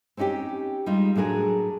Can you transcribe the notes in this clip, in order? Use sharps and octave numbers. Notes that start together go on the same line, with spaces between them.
C4 C#4 D#4 F#4 G4
G3 G#3 D#4 F4
A2 F#3 D4 G#4 A#4